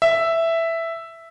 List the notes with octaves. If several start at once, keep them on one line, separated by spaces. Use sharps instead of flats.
E5